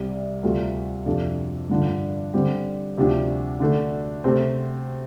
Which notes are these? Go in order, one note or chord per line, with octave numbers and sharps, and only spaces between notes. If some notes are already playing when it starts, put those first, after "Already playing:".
Already playing: C2 C3 G3
D2 C3 G3 F4 A4
F2 C3 F3 D4 A4
G2 D3 F3 D4
D3 G3 C4 G4
D2 C3 F3 D4 G4
D3 A3 D4 A4
C3 A3 C4